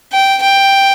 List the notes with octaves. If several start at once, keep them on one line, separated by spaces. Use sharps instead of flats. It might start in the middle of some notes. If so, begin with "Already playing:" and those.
G5
G5